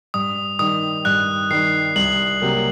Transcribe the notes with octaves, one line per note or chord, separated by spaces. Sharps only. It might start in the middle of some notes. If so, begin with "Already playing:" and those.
G2 D#6
D#3 G3 D#6
G2 F#6
D#3 G3 C7
C2 F#7
C3 F#3 A#3